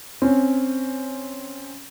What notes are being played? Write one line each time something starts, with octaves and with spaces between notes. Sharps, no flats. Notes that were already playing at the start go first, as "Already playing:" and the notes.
C4 C#4